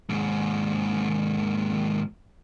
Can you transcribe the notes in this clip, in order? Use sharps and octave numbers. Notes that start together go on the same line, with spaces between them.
D#2 G#2